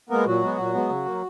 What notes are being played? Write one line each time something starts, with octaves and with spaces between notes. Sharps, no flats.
G#3 A#3 B3 A#4
A#2 F#3 F#4
G#3 B3
A#2
G#3 B3
C#3
F#3 A#3